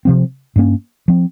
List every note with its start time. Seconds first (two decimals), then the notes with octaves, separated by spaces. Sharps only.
0.05 C3 F3 C4
0.56 G2 G3 A#3 C#4
1.08 F3 C4